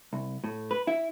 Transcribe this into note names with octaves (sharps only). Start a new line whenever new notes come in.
C2
A2
B4
E4